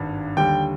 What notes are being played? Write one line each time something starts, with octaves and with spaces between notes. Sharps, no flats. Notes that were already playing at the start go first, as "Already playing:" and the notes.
Already playing: G#1 G2
D#2 D3 G3 G5